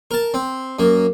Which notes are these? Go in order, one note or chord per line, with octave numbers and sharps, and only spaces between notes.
A#4 A5
C4
F#2 A#3